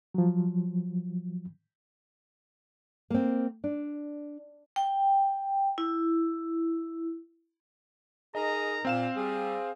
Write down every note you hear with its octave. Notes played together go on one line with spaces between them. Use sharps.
F3 F#3
A#3 C4
D4
G5
E4
D#4 G#4 A#4 D#5 A#5
A#2 C4 F5 E7
G3 G#4